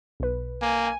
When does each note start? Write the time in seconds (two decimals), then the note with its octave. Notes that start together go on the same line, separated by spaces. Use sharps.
0.20 B1 B4
0.62 A#3 G#5